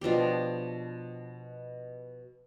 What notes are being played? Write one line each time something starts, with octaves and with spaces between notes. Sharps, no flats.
B2 F3 D4 G4